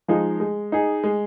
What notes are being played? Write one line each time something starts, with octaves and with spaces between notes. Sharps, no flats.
F3 G#3 D#4
G#3
D#4 G#4
G#3